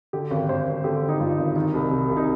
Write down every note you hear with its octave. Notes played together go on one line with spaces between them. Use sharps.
D3 G4
G#1
G2 C5
G#1
D3 G4
G#1
D#4
G2 F4
G#1
D#3 D#4
C2
C3
C2
D#4